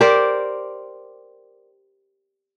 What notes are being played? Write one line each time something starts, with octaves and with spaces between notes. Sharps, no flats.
G4 A#4 C5 D5